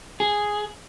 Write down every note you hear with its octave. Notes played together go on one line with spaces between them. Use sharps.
G#4